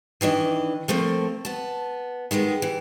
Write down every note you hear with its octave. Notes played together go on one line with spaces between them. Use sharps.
D#3 E3 D4 D#5
F3 A3 A#3 C4
B3 A5
D#3 G3 G#3 B3
E3